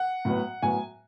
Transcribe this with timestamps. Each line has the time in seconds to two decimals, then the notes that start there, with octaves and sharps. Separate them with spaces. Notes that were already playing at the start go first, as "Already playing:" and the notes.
Already playing: F#5
0.25 A2 F#3 B3
0.62 A2 F#3 B3 G#5